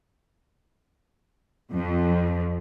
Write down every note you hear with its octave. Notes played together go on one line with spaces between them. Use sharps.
F2